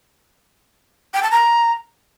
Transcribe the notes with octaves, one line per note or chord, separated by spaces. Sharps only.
G5
A5
A#5